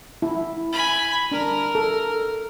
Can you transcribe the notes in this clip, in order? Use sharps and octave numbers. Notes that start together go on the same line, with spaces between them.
E4
G#5 B5
D4 A#4
A4